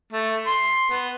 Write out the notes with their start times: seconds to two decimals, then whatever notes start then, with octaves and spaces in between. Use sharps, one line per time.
0.13 A3
0.47 C6
0.90 B3